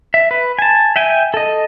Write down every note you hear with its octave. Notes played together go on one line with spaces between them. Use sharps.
E5
B4
G#5 A5
E5 G5 G#5
A4 D#5